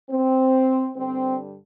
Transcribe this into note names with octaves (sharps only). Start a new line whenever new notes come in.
C4
G2 D3 G3 C4